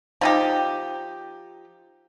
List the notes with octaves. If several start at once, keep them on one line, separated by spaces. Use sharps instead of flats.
F3 D#4 G4